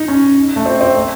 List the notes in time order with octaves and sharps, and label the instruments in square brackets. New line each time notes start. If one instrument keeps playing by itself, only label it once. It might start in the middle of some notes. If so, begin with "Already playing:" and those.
Already playing: [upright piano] D#4
C#4
A3
C4
C4
A3